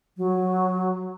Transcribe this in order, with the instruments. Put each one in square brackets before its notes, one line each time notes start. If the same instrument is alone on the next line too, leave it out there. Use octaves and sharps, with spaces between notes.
[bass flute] F#3